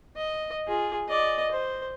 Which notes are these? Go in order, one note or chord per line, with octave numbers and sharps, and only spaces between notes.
D#5
F4 G#4
D5 D#5
C5